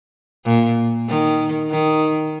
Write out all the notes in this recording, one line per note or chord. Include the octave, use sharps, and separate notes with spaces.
A#2
D#3
D#3